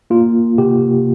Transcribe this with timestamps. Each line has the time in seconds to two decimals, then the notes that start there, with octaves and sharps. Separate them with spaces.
0.10 A#3 F4
0.58 C3 G4